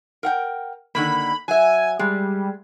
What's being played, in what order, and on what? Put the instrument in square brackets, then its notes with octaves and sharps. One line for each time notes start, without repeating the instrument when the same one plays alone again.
[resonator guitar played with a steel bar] A#4 F#5 G5
[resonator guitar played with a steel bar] D3 D#3 A#3 [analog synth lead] B5
[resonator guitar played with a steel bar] F#3 E5 [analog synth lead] G#5
[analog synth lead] G3 [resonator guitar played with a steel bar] G#3